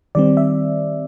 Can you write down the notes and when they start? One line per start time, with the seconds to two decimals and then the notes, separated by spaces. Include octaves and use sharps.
0.15 D#3 G3 C4 D5
0.37 E5